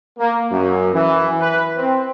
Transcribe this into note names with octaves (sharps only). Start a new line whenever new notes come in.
A#3
F#2
E3
B4
C4